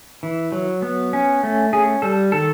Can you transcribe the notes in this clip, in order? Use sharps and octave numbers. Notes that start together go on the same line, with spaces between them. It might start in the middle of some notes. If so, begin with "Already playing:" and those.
E3
F#3
B3
C#4
A3
C#4 G#4
G3 A4
D#3 A4